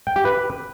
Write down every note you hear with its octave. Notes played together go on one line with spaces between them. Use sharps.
G5
G4
B4